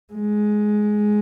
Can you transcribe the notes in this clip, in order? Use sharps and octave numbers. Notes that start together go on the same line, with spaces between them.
G#3